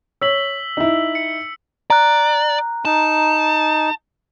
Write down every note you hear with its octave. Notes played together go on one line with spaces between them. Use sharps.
C#5 E6 B6 F#7
D#4 E4
C#7
D5 A#5 F#6
D#4 A5